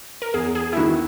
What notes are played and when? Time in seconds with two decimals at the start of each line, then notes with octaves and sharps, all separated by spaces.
0.22 A#4
0.34 E2 G#4
0.55 G#4
0.73 E4
0.77 D#3 F#4